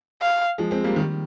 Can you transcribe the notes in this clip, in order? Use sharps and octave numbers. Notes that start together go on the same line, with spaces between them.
F5
F3 G#3
G#3 C4
G3 A#3
D#3 G3